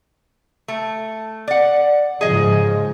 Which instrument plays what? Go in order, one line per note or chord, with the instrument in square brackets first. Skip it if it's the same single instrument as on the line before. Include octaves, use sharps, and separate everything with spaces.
[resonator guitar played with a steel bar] A3
D5 F#5
[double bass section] G#2 C#3 F3 [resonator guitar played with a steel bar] G#4 D#5